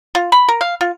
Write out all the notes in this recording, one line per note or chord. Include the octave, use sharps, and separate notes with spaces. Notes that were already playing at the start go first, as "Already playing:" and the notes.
F4
B5
A#4
F5
F4